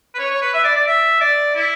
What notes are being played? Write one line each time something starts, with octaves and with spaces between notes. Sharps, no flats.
B4
C#5
C#5
B4
E5
D5
D5
E5
D5
E4